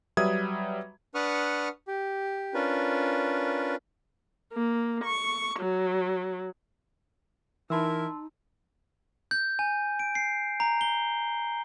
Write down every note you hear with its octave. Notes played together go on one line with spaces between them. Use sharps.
F#3 G3 B4 E5 D#6 G#6
D4 B4 F#5 C#6 D#6 F6
G4
C#4 D4 F4 A#4 B4
A#3
C#6
F#3
E3 D#4 E4 A#4 A5 C6 E6
G6
G#5
D7
C7
A#5
G7